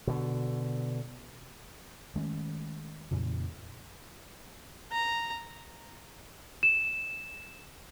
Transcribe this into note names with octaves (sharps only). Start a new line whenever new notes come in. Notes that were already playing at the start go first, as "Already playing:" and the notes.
B2 D3
D#3 G#3 A3 C#4
F2 A#2 C#3 E3
A#5
E7